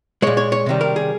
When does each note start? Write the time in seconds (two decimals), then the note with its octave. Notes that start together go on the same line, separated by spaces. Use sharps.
0.22 A#2 G#3 C#5
0.37 C#5
0.52 C#5
0.66 C3 D#3 G3
0.81 A#4
0.96 G#4